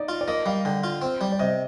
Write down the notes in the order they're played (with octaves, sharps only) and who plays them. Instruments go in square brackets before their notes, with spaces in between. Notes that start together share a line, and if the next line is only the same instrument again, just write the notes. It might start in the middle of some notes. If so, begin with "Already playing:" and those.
Already playing: [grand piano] D#4 D5
[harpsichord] F4
[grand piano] D5
[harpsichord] A#3 [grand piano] D#5
[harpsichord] G3 [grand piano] F5
[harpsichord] D3 [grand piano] G5
[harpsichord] F4
C4
G3
[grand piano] D5
[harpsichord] C3 [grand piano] D#5